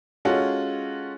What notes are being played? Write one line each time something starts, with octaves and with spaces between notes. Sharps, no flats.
G#3 C#4 F4 F#4 A4